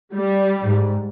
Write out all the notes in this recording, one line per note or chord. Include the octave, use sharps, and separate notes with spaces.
G3
G#2